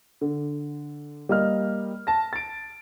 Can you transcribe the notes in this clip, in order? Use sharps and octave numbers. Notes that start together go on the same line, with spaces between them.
D3
G3 A#3 D#5 F6
A5 A#6
A6 D7